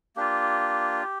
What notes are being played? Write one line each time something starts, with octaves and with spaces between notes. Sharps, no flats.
A#3 D4 F4 G4